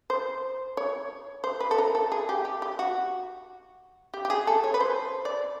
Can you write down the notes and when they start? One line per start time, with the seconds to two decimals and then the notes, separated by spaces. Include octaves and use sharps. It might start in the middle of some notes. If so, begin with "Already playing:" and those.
0.10 C5
0.77 C#5
1.44 C5
1.60 B4
1.71 A4
1.78 A#4
1.95 A4
2.12 G#4
2.29 G4
2.45 G4
2.62 G4
2.79 F#4
4.14 G4
4.25 G4
4.30 G#4
4.47 A4
4.64 C#5
4.74 B4
4.80 C5
5.25 D5